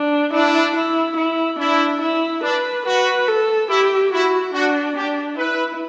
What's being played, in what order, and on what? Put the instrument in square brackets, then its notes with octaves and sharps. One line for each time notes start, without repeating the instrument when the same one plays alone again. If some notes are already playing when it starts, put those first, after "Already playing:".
Already playing: [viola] D4
[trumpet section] D4 [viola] E4
[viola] E4
E4
[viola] D4 [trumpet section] E4
[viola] E4
[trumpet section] D4 [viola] B4
[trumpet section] F#4 [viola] B4
[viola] A4
[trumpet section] E4 [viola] G4
[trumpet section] E4 [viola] F#4
[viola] D4 [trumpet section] F#4
[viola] D4 [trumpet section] G4
[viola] E4 [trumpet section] B4